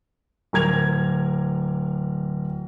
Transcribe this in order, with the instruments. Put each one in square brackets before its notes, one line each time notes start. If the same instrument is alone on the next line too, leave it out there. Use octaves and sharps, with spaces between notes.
[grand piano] D1 A#4 G#6 F7